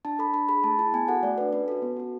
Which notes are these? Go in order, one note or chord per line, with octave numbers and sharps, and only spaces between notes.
D4 A5
A4 B5
D4 B5
G#4 B5
A3 A5
E4 G#4 A5
B3 G#5
F#4 A4 F#5
A3 D5
D4 A4 B4
C#4 B4
F#4 A4
B3
F#4 A4